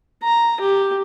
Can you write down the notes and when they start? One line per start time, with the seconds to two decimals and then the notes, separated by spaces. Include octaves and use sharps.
0.23 A#5
0.61 G4